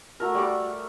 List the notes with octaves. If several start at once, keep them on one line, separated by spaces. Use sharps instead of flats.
A3 F#4 A#4
G3 C#6 D6